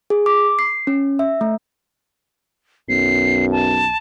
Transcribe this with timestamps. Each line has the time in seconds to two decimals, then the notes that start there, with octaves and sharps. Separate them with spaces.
0.10 G#4
0.26 D6
0.59 C7
0.87 C#4
1.19 E5
1.41 A3
2.89 B1 F#2 C7
3.52 A5